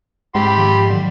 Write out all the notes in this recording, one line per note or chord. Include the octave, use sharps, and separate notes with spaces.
G#2 G4 B5 C6
D#3 F3
A2 D3 F#3